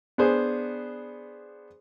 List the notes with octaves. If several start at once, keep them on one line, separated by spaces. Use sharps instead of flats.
B3 D4 G#4 C5